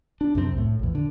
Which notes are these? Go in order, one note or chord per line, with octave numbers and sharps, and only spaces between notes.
D4
C2 F#2 E3 C4
A2
A#1 E2
D3